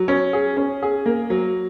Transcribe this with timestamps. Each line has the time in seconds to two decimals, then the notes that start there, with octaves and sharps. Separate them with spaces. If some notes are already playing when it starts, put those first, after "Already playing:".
Already playing: F#3
0.08 C#4
0.33 G#4
0.57 C#4
0.83 G#4
1.06 A#3
1.30 F#3